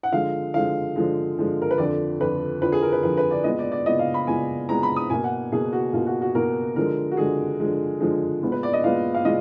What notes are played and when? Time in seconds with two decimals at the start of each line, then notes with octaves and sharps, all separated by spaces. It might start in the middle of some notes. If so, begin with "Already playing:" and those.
0.03 F#5
0.12 D3 F3 G#3 F5
0.54 D3 F3 G#3 F5
0.96 D3 F3 G#3
1.37 D3 F3 G#3
1.62 A#4
1.71 B4
1.78 F2 D3 F3 D5
2.20 F2 D3 F3 B4
2.61 F2 D3 F3 B4
2.72 G#4
2.82 A#4
2.93 B4
3.03 F2 D3 F3 B4
3.17 B4
3.31 D5
3.44 A#2 G#3 B3 D#5
3.59 D5
3.72 D5
3.86 A#2 G#3 B3 D#5
3.99 F5
4.14 B5
4.27 A#2 G#3 B3 G#5
4.69 A#2 G#3 B3 A#5
4.83 B5
4.96 D#6
5.10 B2 A#3 G#5
5.24 F#5
5.52 B2 A#3 G#4
5.73 F#4
5.93 B2 A#3 F4
6.07 F#4
6.22 F#4
6.35 B2 A#3 A#4
6.76 D3 F3 G#3 A#4
7.11 F#4
7.17 D3 F3 G#3 G#4
7.60 D3 F3 G#3
8.00 D3 F3 G#3
8.43 A#2 G#3 B3
8.52 B4
8.63 D5
8.73 D#5
8.84 A#2 G#3 B3 F5
9.14 F5
9.25 A#2 G#3 D#5